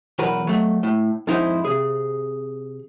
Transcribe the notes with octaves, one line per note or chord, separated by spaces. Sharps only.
B1 E2 F#4 A#4 B4
F#3 A3
A2
F2 G#2 D#4 E4 C5
C3 G#4